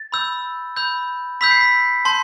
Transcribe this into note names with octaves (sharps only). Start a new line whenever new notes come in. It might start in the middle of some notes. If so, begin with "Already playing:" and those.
Already playing: A6
B5 E6 G6
B5 E6 G6
B5 E6 G6 B6
C7
B6
A5 C6 G6